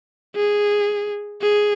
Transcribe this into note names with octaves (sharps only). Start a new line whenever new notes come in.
G#4
G#4